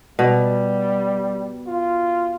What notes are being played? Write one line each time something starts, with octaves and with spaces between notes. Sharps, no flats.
B2 G3
F4